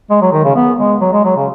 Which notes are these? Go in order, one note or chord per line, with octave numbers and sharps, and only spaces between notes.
G#3
F#3
D#3
C#3
B3
G#3
F#3
G#3
F#3
C#3